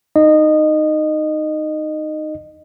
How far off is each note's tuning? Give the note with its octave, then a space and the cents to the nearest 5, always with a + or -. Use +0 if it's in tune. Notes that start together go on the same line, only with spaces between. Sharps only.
D#4 -5 D#5 -20